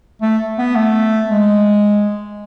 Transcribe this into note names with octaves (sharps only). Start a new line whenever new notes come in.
A3
B3
A3
G#3